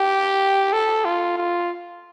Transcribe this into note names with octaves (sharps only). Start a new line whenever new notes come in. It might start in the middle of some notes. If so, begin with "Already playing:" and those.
Already playing: G4
A4
F4
F4